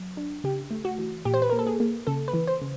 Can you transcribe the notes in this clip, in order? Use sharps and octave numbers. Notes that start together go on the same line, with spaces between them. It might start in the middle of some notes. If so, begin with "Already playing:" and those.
Already playing: F#3
D4
C#3 G4
A3
F#4
E3
A#2 G4
C5
B4
A#3 A#4
A4
G#4
A#3
C#3 A4
B4
E3
C5
C#3